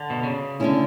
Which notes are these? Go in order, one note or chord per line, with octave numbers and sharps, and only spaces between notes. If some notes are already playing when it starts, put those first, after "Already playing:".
Already playing: D3
B2
C#3
D3 A3 C#4 E4